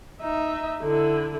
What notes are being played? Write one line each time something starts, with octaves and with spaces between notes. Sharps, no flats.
D#4 E5
D3 E4